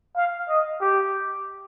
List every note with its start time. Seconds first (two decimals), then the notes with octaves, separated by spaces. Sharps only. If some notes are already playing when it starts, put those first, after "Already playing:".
0.16 F5
0.48 D#5
0.81 G4